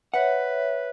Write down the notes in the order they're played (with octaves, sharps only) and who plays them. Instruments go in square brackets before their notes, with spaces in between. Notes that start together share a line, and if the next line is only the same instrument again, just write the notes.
[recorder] B4 [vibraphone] C#5 E5 [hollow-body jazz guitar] F#5